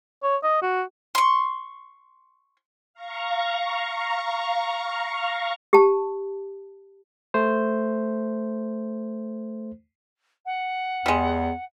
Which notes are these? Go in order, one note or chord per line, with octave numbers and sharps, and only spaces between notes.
C#5
D#5
F#4
C6 C#6
F5 A#5 C#6
G4 A5
A3 C5
F#5
E2 G3 G#3